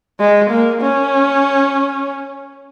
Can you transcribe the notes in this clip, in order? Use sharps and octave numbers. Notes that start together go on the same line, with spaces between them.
G#3
A#3
C#4